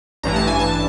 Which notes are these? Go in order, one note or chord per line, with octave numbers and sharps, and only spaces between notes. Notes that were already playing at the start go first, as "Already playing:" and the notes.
A1 G2 E3 A#5
A5
G#5
A5